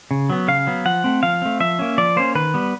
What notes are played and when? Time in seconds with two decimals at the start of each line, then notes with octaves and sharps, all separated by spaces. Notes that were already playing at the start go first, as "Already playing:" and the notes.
0.11 C#3
0.30 F#3 B3
0.48 C#3 F5
0.67 F#3 B3
0.85 F3 F#5
1.04 A3 C4
1.23 F3 F5
1.42 A3 C4
1.60 F3 E5
1.79 A#3 C#4
1.98 F3 D5
2.16 A#3 C#4 C5
2.35 D#3 B4
2.54 G3 B3